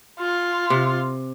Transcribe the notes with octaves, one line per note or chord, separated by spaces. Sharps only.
F4
C3